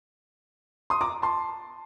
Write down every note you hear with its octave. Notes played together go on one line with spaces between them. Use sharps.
C6 D#6
A#5 D6
A5 C6